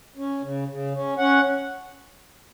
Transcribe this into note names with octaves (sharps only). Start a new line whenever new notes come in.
C#4
C#3
C#3
C#4
C#4 F#5